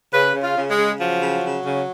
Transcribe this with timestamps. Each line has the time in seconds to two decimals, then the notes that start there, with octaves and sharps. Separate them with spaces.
0.12 C#3 B4
0.33 C#3
0.41 F4
0.56 C#3
0.70 G#3
0.76 C#3
0.99 F3 F#3
1.20 C#3
1.43 C#3
1.63 C#3